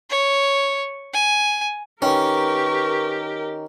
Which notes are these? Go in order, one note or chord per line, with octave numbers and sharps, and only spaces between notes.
C#5
G#5
D#3 C#4 G4 A#4 B4 C#6